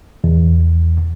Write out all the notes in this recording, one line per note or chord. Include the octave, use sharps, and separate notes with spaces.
E2